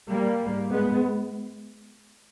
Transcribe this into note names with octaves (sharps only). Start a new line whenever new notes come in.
G3 A#3
G#2
G#3 B3